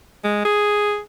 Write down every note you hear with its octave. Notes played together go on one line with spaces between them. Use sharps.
G#3
G#4